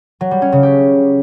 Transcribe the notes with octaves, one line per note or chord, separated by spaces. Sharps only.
F#3
G3
C#4
C#3
G4